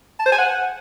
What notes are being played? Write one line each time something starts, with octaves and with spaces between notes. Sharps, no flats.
A5
C5
G#5
F#5